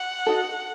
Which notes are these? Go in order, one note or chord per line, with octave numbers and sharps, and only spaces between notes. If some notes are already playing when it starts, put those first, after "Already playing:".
Already playing: F#5
D#4 F#4 A4